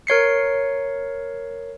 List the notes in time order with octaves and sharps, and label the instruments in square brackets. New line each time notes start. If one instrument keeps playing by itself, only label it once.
[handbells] A#4 C#5 C7 C#7